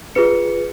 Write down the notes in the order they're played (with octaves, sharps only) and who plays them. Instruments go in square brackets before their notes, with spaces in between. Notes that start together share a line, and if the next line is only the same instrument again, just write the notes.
[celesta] F4 G#4 B4 C#7